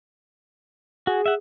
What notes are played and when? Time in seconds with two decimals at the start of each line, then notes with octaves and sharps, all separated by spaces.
1.07 F#4 G#4
1.26 E5 F#5